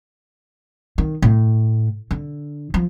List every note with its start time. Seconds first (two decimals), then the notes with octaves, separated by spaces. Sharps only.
0.98 D#3
1.22 A2
2.11 D3
2.74 F3